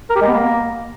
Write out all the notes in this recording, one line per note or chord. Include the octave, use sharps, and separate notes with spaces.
A#4
G4
G#3
B3
A#3